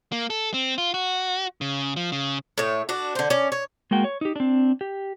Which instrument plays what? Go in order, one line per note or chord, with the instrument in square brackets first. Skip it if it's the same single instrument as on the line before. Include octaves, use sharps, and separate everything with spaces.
[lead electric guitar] A#3
A4
C4
F4
F#4
C#3
F3
C#3
[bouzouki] A2 C#5
D4 F#4
D3 C5
C#4 D5
C#5
[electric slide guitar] G#3 A#3 F#4 G5
C#5
D#4 G4
C4 D4
G4